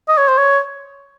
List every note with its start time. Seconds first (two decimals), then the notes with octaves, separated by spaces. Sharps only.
0.08 D#5
0.18 C#5
0.28 C5
0.38 C#5